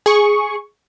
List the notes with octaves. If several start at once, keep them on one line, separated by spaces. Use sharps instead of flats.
G#4 C#6